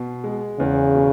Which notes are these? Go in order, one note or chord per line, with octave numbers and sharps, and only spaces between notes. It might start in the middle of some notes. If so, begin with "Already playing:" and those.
Already playing: B2
G#3
E2 C#3
B2